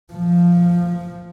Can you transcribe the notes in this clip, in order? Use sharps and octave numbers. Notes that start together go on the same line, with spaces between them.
F3